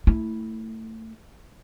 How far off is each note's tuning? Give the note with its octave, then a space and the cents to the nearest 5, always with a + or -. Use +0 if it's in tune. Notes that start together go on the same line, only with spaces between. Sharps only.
A3 +25 E4 -10